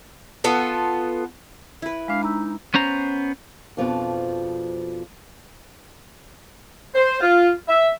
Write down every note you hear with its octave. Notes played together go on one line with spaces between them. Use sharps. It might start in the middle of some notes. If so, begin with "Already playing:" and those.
B3 F4 A4
E4 B4
G#3 D4 F5
D#4 A#5 E6
B3 C#4 C5 A#5
F2 B2 F3 D4
C5
F4
E5